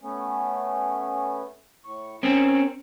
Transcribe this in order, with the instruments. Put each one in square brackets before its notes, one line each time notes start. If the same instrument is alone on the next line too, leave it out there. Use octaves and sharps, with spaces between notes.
[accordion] A3 B3 C#4
A2 C#6
[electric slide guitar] C4 C#4 [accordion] A#4 D#6